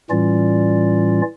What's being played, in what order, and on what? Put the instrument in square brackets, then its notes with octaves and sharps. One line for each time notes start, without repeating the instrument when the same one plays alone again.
[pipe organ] A2 E3 G3 C#4 F4 D5